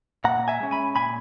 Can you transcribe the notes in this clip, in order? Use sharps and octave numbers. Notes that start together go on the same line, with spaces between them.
A#2 F#5 A#5
E5 G#5
G#3 C#4
G#5 B5
A#2 G#5 B5